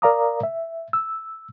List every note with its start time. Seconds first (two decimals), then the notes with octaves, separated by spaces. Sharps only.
0.02 A#4 D5 F5 A#5 D6 D#6
0.43 E5
0.93 E6